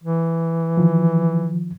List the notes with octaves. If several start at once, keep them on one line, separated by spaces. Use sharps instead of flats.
E3
D#3 F3